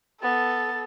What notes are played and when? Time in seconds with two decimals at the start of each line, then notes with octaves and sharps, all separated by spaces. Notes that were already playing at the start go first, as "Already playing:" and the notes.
0.23 B3 A4 A6